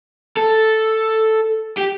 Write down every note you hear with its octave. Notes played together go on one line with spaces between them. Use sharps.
A4
G4